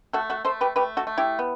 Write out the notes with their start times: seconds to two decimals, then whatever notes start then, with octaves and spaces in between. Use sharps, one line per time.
0.13 A3 F#4 A4
0.30 F#4 A4
0.45 A3 A4 C5
0.61 G4 B4
0.76 A3 G4 B4
0.97 F#4 A4
1.07 A3
1.18 E4 G4
1.39 B3